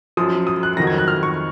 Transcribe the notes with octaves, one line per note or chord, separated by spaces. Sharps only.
F#2 F3 D#6
D#6
F#6
F2 D#3 F#3 A#6
G#6
F#6
F6
C#6